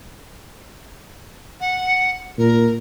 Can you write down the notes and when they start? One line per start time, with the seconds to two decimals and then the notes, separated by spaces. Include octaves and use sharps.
1.61 F#5
2.38 A#2 A#4